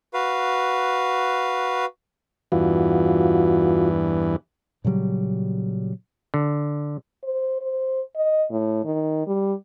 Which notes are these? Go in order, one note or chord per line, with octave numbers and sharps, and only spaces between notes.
F#4 B4 F5
E2 G2 E3 F4 F#4
A#2 C#3 F#3 G3
D3
C5
C5
D#5
A2
D#3
G3